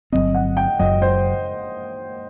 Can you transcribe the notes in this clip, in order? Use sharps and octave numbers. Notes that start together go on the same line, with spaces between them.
G1 G2 F#3 C4 D#5
F#5
G5
F#1 F#2 F#3 D#5
C5